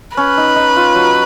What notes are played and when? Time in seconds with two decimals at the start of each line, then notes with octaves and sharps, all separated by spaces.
0.17 C#4 B4
0.37 D#4
0.56 D#4
0.76 F4
0.95 F#3